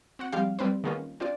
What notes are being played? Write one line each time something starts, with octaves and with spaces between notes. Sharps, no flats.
C4 F#4 F#5
F3 G3 G#3 C4 G4 F5
G3 C4 B4 C5
D#3 G#3 A#3 B3 C#4 F4
C4 D4 F4 C5 D5